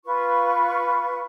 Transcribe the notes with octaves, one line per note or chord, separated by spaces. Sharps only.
F4 B4 C#6